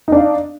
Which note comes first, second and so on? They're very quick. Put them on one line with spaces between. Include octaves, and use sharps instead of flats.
D#4 D4 F5